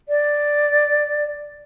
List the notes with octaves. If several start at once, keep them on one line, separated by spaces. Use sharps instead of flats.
D5